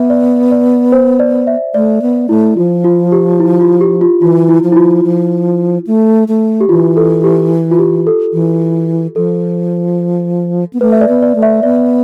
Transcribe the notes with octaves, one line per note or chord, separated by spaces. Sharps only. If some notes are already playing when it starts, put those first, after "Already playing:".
Already playing: B3 E5
D5
D5
C5
D5
E5
A3 D5
B3
A3 E4
F3 F4
F4
G4
E4
F4
G4
F4
E3 F4
E4
F3
E4
F4
F3
A3
A3
G4
E3 F4
A4
G4
F4
G4
A4
E3
F3 A4
B3
A3 B4
E5
D5
B3
D5
A3
E5
B3 D5